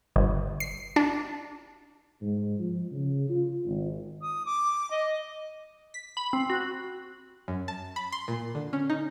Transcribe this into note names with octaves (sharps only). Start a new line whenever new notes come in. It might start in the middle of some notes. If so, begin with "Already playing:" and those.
G1
C7
D4
G#2
F3
C#3
F4
G#1
D#6
D6
D#5
B6
B5
C4
F#4
F#2
A5
B5
C6
A#2
D3
C#4
D#4